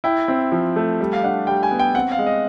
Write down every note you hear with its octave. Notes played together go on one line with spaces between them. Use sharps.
E4 G5
C4
F3
A3
G3
F5
D4 F#5
G3 G5
G#5
B3
G5
C4 F#5
F5
G#3
D#5